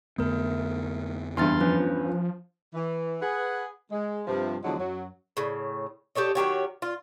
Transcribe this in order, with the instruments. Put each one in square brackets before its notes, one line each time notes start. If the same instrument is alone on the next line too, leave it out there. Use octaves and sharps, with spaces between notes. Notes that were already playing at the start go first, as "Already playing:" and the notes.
[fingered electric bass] F2 D3 B3 [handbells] A3 A#4
[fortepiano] E2 G2 [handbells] C6 F6 A6
[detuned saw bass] F3 [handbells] C#4 B4
[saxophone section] E3
G#4 B4 F#5
G#3
G2 C3 F3
E2 D3 F3 F#3 G#3 D4
F#2 F#3
[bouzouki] A2 C#3
G4 A4 C#5 D#5
D#3 F#3 G4 C#5
F4